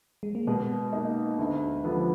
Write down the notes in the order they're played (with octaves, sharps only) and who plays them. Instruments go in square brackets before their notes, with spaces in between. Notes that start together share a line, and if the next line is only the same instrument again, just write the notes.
[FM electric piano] G#3
A#3
[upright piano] B2 [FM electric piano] G#3 B3
[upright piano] A#3 D#4
D2
D3 F3 B3